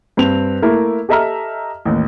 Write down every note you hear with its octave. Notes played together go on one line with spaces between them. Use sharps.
G2 C4 F7
A3 A#3 E4 A#4
G4 A4 D#5 E5 A#5 F6
A1 D#2